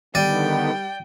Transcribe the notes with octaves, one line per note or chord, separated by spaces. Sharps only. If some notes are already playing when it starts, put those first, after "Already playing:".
D3 D#3 G3 B3 D5 G5 D#7